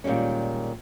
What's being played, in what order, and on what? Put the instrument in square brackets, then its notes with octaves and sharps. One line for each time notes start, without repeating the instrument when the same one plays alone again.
[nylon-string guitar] A#2 D#3 G3 G#3 C#4